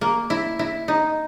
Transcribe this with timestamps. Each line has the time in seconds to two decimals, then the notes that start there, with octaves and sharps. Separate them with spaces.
0.01 A#3
0.30 E4
0.59 E4
0.88 D#4